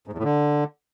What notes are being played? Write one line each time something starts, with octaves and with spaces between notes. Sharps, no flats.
G#2
E2
A2
D3